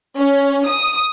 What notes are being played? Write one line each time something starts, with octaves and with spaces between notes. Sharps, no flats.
C#4
D#6